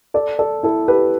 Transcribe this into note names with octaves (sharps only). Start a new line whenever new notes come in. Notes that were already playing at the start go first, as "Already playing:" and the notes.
A4 D5
A4 D5
E4 A4
G4 B4